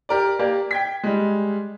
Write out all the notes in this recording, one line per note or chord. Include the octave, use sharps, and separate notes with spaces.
G4 A#4 D5
A#3 G4 D5
G5 G#6 B6
G3 G#3